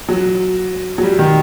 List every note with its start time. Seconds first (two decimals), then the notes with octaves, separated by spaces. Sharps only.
0.09 F#3
0.98 F#3
1.03 G3
1.19 D#3